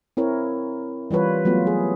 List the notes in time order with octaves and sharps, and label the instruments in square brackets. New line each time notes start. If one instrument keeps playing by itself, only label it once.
[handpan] C4 E4 A#4 C#5
E3 G3 F4 B4 C#5
F#3 A3 B3 F4
G#4